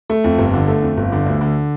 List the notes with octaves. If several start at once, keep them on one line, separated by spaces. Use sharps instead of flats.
A3
F2
G1
D3
A3
F2
G1
D3
D2
D3